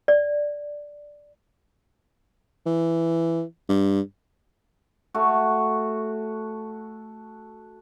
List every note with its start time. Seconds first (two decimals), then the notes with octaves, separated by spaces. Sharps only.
0.08 D5
2.66 E3
3.69 G2
5.14 A3 F#4